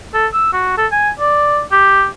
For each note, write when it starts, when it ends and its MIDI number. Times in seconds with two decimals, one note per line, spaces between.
0.14 0.27 69
0.34 0.51 88
0.53 0.76 66
0.78 0.87 69
0.92 1.10 80
1.20 1.61 74
1.72 2.06 67